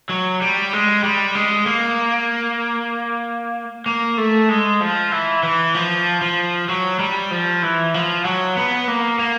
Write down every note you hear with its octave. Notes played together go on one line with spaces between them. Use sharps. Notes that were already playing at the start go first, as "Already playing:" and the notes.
F#3
G3
G#3
G3
G#3
A#3
A#3
A3
G#3
F3
E3
E3
F3
F3
F#3
G3
F3
E3
F3
F#3
B3
A#3
A#3